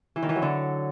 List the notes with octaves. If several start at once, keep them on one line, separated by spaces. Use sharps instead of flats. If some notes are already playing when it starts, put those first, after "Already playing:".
E3
D#3
E3
F#3
D3